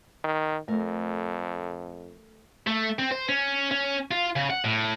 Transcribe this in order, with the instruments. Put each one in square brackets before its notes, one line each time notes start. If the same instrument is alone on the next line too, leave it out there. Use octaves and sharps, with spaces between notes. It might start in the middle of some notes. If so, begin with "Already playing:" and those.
[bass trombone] D#3
[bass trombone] F2 [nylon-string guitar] A3 A#4
[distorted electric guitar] A3
C4
C5
C#4
C#4
F4
C#3
F#5
A2